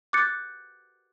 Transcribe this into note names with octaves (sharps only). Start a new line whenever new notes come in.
D6 F#6 G6 A6 C#7